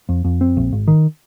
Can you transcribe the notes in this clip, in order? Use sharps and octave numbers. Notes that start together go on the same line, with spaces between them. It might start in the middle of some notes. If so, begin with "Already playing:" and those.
F2
F2
C4
A#1
G#1
D#3